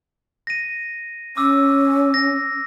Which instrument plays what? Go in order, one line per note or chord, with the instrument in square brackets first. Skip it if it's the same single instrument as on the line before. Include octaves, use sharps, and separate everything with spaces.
[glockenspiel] A#6 D#7
[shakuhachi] C#4 [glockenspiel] D6 E6
[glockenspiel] A#6